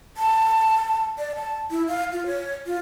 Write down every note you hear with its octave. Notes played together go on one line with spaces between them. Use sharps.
A5
D5
A5
E4
F5
F4
C#5
F4